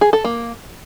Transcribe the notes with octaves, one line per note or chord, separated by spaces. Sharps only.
G#4
A4
A#3